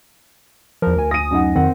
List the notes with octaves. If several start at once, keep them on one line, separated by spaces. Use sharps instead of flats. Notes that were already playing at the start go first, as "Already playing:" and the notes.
E2 F3 A#4
D2 G#5
D#6 A#6 D#7
F#2 D#4 F#5
F2 D#3 C4 A#4 F#5